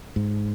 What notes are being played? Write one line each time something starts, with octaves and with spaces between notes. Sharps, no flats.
G#2